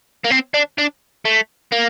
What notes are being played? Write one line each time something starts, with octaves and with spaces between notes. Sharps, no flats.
A#3
C4
D4
D4
A3
A#3